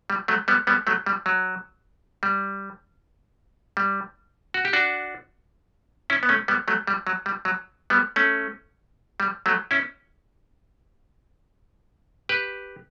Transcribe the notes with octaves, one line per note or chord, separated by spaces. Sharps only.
G3
F#3 A3
G3 B3
G3 B3
F#3 A3
G3
F#3
G3
G3
F#4
G4
D4 F#4
C#4 E4
B3
A3 C#4
G3 B3
F#3 A3
G3
F#3
G3
F#3
G3 B3
A3 C#4
G3
F#3 A3
C#4 E4
G4 B4